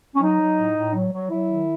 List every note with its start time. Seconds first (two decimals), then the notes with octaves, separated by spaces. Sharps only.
0.15 C#4
0.22 F#3 D#4
0.40 F#3
0.58 A2
0.76 A2
0.94 F#3
1.12 F#3
1.31 F#3 E4
1.48 D#3